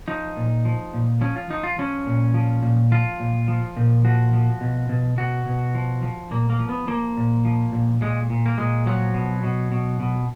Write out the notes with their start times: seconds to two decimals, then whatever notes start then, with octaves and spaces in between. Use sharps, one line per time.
0.08 F3 D#4
0.37 A#2
0.65 F3
0.94 A#2
1.21 F3 C#4
1.36 F4
1.50 F3 D#4
1.63 F4
1.78 F3 C#4
2.07 A#2
2.34 F3
2.63 A#2
2.91 F3 F4
3.20 A#2
3.48 F3
3.77 A#2
4.05 F3 F#4
4.33 F3
4.61 B2
4.89 B2
5.18 B2 F#4
5.46 B2
5.75 F3
6.03 F3
6.31 A#2 A#3
6.50 A#3
6.59 F3
6.69 B3
6.87 F3 A#3
7.17 A#2
7.45 F3
7.72 A#2
8.01 A#2 G#3
8.30 A#2
8.46 A#3
8.58 A#2 G#3
8.86 F3 F#3
9.14 B2
9.43 B2
9.72 B2
10.00 B2